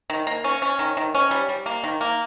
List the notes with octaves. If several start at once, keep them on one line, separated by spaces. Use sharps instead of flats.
D#3
A#3
C#4
C#4
D#3
D#3
C#4
G3
G3
A#3
D#3
A#3